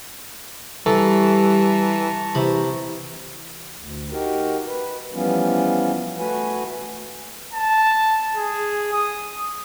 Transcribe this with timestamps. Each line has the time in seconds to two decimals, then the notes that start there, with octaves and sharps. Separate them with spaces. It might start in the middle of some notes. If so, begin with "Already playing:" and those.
0.86 E3 G3 A4 A5 A#5 C#6
2.35 C3 E3 B5
3.79 D2
4.12 D#4 F#4 G4 A#4
4.67 B4
5.14 E3 F3 G3 B3 C#4 F4
6.19 A3 F#4 B4 G#5
7.53 A5
8.37 G#4
8.93 D#6